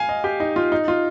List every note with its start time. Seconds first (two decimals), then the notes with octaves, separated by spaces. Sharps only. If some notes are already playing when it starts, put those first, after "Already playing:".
Already playing: F5 G#5
0.09 D#5
0.24 G4
0.40 D#4
0.56 F4
0.72 D#4
0.88 F4